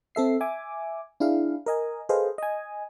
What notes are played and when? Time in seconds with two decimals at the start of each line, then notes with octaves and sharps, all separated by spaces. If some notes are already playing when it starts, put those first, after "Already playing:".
0.15 C4 A4 E5 C7
0.41 E5 G#5 D6
1.20 D4 E4 G#4 F5
1.66 A#4 D#5 G#5
2.09 G#4 A4 B4 C5 D#5 F5
2.38 D#5 G#5